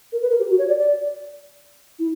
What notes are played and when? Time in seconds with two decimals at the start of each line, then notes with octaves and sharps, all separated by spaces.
0.12 A#4
0.22 B4
0.30 A#4
0.40 G4
0.50 F#4
0.59 C#5
0.68 D5
0.78 D5
1.99 E4